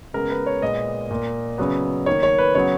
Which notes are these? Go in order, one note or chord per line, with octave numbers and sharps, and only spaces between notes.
C#3 G#3 B3 A#4
B4
C#5
A#2 G#3 B3 D#5
A#2 A#3
C#3 F#3 B3
D#3 A#3 C#5
C#5
B4
C#3 F#3 B3 C#5